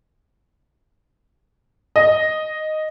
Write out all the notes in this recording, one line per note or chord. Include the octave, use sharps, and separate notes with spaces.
D#5